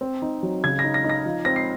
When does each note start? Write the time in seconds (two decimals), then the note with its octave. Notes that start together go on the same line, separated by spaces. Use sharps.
0.01 C4
0.22 D#4
0.43 F#3
0.64 C#3 G#6
0.79 A#6
0.84 D#4
0.94 A#6
1.04 D#4
1.09 A#6
1.25 F3
1.45 C4 A#6
1.56 C7